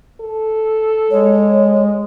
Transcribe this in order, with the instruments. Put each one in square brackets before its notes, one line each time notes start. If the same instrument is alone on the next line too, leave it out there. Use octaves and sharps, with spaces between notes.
[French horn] A4
[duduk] G#3 [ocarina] C#5